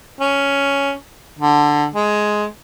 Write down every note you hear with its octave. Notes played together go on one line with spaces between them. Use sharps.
C#4
D3
G#3